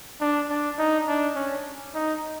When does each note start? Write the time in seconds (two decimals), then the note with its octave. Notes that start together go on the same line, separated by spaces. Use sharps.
0.21 D4
0.50 D4
0.79 D#4
1.08 D4
1.36 C#4
1.94 D#4